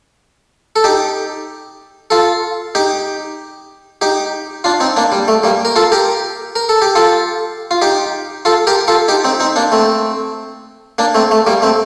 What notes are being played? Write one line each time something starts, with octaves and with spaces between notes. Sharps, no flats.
A4
D#4 G4
F4 A4
D#4 G4
D#4 G4
D4 F4
C4 D#4
A#3 D4
G3
A3
G3 A#3
A#4
F4 A4
G4 A#4
A#4
A4
G4
F4 A4
F4
D#4 G4
F4 A4
G4 A#4
F4 A4
D#4 G4
C4 D#4
C4 D#4
A#3 D4
A3 C4
A#3 D4
A3 C4
A3
G3 A#3
A3 C4